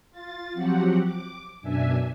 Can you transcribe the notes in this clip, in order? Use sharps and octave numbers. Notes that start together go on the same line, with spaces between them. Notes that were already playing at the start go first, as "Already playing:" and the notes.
F4 A6
F3 F#3 C4 F#4 G4 F#5
D6
F#2 B2 D4 E5 G#5